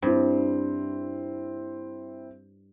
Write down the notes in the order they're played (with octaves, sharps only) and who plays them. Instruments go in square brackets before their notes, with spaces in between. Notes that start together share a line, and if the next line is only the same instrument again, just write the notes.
[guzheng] G2 [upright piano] C4 E4